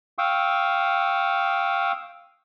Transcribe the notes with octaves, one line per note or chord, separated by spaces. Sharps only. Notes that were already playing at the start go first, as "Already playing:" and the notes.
F5 G5 C#6 D#6 E6